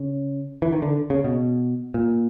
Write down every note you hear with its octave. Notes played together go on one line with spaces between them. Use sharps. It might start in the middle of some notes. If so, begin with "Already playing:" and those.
Already playing: C#3
E3
D#3
D3
C#3
B2
A#2